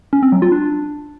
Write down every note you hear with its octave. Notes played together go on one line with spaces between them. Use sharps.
C#4
C4
F#3
F4
D4